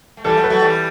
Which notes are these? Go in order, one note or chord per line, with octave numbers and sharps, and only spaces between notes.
A3
E3 G3 A4
F#3 A3
B4
F#3 A3
E3 G3